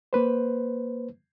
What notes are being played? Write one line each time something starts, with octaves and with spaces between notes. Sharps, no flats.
A#3 B4 C5